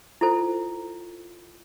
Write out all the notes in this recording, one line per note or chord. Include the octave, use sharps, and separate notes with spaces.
E4 F4 A4 C5